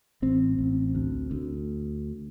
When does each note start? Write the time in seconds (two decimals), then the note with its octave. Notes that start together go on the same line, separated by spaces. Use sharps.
0.22 A1 C4
0.59 A1
0.95 D2
1.31 D2